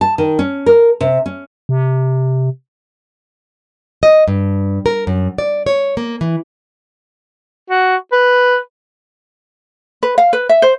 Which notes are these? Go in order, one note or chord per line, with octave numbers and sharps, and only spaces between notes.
A5
D#3
C#4
A#4
C3
C#4
C3
D#5
G2
A#4
F#2
D5
C#5
A#3
E3
F#4
B4
B4
F5
B4
E5
C5